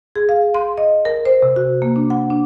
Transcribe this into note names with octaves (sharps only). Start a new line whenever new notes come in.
G#4
F5
C6
D#5
A#4
C5
C3
F#4
A#3
D4
F#5
D4